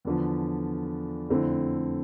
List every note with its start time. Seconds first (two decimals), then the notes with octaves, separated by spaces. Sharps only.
0.05 E2 D3 F3
1.29 F2 D3 A3 C4 E4